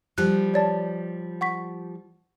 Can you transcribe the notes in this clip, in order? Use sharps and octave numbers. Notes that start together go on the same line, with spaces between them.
F3 G3 F#6
C#5 D5 A5
F#5 C#6 B6